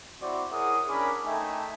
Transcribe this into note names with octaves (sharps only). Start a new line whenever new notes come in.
C4 E4 F#4 C5 D5
E4 G#4 A#4 C#5 F#5 D#6
C#4 D4 G#4 A#4 B5 D6
A3 D#4 A4 E5 G5 G#5